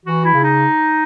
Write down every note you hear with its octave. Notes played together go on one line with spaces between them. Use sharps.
E3 F#4
E4
C#3
D#4